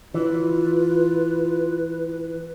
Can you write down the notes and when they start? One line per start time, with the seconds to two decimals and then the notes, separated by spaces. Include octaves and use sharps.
0.14 E3 F4 B4